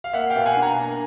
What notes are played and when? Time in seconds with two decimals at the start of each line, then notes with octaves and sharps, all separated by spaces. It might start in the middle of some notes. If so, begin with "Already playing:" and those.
0.04 F5
0.13 A#3 E5 F#5
0.30 F5 G5
0.36 B2
0.46 F#5 G#5
0.57 D4
0.62 G#5 A#5
0.79 A#3